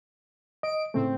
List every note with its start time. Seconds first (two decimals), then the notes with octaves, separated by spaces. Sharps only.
0.63 D#5 D7
0.94 A2 C#3 A3 C4